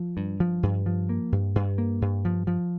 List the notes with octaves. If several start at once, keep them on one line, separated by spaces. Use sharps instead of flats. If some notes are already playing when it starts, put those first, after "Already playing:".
Already playing: F3
G2
F3
G2
F3
A#3
G2
G2
A#3
G2
F3
F3